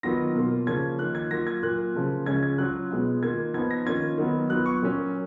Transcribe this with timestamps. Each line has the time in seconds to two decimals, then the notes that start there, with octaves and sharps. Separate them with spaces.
0.03 D#3 F#3 B3 F4 A#6
0.35 B2 A#3 F4
0.67 C#3 F3 A#3 C#4 F4 G#6
0.99 D#3 A#3 F4 F#6
1.15 G#6
1.31 F#3 A#3 F4 A#6
1.47 G#6
1.63 A#2 F#3 A#3 F4 F#6
1.95 C#3 F3 A#3
2.26 C#3 G#3 C#4 F4 G#6
2.43 G#6
2.58 F#3 C#4 F4 F#6
2.90 B2 G#3 B3 F4
3.22 D#3 A#3 F4 G#6
3.54 F3 B3 D#4 G#6
3.71 A#6
3.86 D#3 A#3 C#4 F4 G#6
4.18 D#3 F#3 B3
4.50 F#3 B3 F4 F#6
4.66 C#6
4.82 A#2 F#3 A#3 C#4